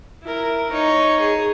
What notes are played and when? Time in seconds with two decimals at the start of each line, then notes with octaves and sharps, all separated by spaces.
0.23 E4 A#4
0.71 D#4 C#5
1.20 G#4